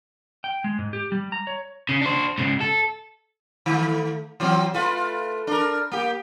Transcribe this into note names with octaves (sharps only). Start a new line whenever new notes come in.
G5
G#3
G#2
G4
G3
A#5
C#5
C#3
D4 C5
G#2 C#3
A4
D#3 A3
E3 F#3 C4
A3 F4 B4
D4 A#4
A#3 G4